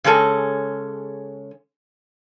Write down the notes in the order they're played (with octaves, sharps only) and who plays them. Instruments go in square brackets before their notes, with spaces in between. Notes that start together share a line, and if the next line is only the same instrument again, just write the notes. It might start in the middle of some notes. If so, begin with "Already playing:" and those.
[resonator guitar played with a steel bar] C#3 G#3 C#4 A4